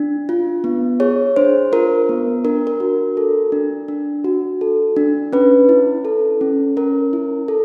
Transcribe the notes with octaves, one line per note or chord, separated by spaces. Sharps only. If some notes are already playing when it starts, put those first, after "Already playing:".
Already playing: D4
F4
B3
G#4 C#5
D4 C5
F4 A#4
B3
D4 A#4
A#4
F#4
A4
D4
D4
F#4
A4
D4
C#4 B4
E4
A4
C#4
C#4 A#4
E4
A4